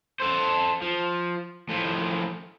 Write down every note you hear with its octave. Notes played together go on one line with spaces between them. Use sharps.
A4 C5
F3
A2 F3